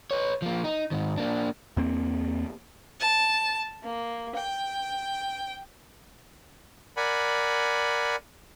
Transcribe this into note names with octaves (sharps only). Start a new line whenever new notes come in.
B4 C#5
F3 A#3
D#4
G#2 D#3
A#3 D4
E2 A#3 C4
A5
A#3
G5
A#4 D5 F#5 G#5 B5